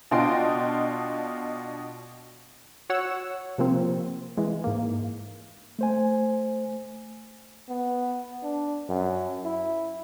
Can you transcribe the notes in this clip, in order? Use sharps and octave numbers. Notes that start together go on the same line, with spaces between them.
B2 D4 F4 D#5 G5 C6
F#4 C#5 F#5 E6
C3 F3 A#3 C4
E3 G#3
G#2 A#3
A3 C5 G#5
B3
D4
F#2
E4